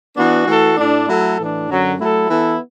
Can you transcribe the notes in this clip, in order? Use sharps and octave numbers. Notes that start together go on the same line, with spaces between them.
E3 B3 D4 F#4
E3 A3 F#4 A4
A2 A3 D4
F#3 A3 E4 A4
A2 E3 D4
F#2 D3 F#3
F#3 A3 E4 A4
E3 B3 E4 A4